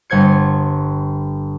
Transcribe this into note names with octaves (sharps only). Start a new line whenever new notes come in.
G1 C5 G#6 C#7